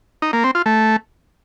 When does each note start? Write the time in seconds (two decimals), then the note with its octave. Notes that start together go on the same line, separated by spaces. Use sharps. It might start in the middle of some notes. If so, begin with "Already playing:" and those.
0.22 D#4
0.33 A#3
0.44 C4
0.55 F4
0.66 A3